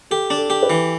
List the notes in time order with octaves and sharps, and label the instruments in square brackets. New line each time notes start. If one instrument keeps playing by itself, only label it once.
[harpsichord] G4 [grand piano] A4
[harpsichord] D4
[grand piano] A4
[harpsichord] G4
[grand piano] B4
[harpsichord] E3